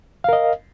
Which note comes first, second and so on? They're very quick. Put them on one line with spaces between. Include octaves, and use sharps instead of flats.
F5 A#4 D#5